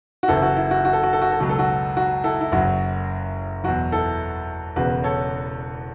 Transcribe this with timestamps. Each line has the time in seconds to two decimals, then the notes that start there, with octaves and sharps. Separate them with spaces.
0.23 F#4
0.28 F#1 F#2 E3 E4 A4
0.42 F#4
0.56 E4
0.71 F#4
0.85 F#4
0.93 A4
1.03 F#4
1.13 A4
1.22 F#4
1.32 A4
1.40 C#2 B2 F#3 F#4
1.49 A4
1.59 F#4
1.97 F#4
2.24 E4 A4
2.41 E4
2.52 F#1 F#2 F#3 F#4
3.64 E2 B2 F#3 F#4
3.92 E4 A4
4.76 E1 E2 C#3 F#4 B4
5.04 A4 C#5